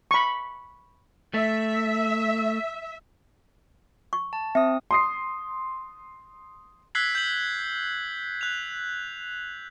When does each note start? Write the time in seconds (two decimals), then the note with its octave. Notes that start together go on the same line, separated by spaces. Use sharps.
0.11 B5 C#6
1.34 A3 E5
4.13 C#6
4.33 A5
4.55 C4 E5 D#6
4.91 C6 D#6 C7
6.95 E6 F#6 G#6 B6 C7 F#7
7.15 G6 F#7
8.41 F#6 F7